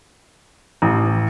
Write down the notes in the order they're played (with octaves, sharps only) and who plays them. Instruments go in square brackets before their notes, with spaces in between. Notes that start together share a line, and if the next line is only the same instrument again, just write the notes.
[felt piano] A1